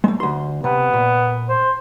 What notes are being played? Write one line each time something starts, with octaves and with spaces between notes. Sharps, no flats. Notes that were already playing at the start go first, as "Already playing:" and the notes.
G#3 A3
D2 C6
C3 B3
A#2
C5